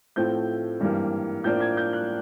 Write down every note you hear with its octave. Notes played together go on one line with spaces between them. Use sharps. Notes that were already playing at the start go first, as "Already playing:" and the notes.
A2 F3 A3 C4 G6
G#1 G2 E3 G3 A#3
A2 F3 A#3 D4 G6
G#6
G6
F#6